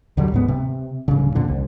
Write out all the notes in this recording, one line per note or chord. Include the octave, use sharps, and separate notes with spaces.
D#2 D3 F#3 G3
D1 G#2 B3
C3
D1 G2 C#3
E2 A#2 D3 D4
C2